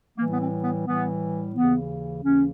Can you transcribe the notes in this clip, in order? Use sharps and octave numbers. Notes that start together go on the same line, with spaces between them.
A2 E3 G3 A#3
B3
C4
B3
A2 E3 G3 B3
D#2 C#3 E3 B3
D#2 C#3 E3 C#4